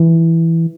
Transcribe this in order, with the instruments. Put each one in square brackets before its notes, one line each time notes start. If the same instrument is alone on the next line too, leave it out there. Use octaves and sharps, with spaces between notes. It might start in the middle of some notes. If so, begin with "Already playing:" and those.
Already playing: [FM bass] E3